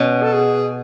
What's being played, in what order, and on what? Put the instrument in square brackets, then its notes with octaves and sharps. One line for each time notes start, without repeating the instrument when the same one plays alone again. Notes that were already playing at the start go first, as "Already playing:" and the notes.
Already playing: [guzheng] B2 [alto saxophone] C#4
[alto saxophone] A4
G#4